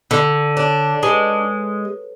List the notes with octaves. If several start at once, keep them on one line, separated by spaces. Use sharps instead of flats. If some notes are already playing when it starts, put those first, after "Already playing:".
D3 A4
D4 C#5
G#3 B4